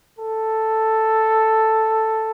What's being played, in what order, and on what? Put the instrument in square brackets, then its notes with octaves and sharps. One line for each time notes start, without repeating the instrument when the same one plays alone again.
[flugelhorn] A4